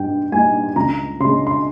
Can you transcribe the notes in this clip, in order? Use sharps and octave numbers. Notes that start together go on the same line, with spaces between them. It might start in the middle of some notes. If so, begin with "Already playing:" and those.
Already playing: G2 D#4 G5
G3 A#3 D#4 G#5
C#2 A#5
C#3 G#3 C6
C6